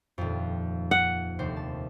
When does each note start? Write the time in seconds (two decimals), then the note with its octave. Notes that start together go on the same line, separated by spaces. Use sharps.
0.18 D#1 F2
0.91 F#5
1.39 F1 D#2 C5
1.57 A5